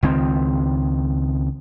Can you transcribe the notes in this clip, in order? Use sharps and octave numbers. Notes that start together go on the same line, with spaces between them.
C#2 D#3 C4